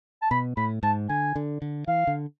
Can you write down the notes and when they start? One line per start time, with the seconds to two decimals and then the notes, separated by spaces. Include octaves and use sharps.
0.22 A5
0.31 B2 B5
0.57 A2 B5
0.83 G#2 A5
1.09 D3 G#5
1.36 D3
1.62 D3
1.87 E3 F5
2.07 D3